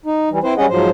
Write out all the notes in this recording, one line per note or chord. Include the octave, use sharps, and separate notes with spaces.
D#4
E3 G3
C4 E4 B4 C5
G3 C#4 G#4 D#5 F#5
G#2 F3 F#3 C5